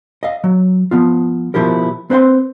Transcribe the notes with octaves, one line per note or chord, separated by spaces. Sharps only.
D#5 F5
F#3
F3 B3 F4
B2 F3 E4 G4 A#4
C4 B4 C5 F5 C6